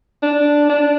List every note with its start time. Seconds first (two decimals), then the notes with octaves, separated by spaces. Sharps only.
0.23 D4
0.70 D4